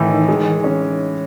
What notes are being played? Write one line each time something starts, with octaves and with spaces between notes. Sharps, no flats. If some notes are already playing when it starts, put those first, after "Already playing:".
Already playing: A2 D#3 E3
G#3
C#4